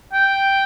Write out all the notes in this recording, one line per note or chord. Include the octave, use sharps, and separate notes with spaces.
G5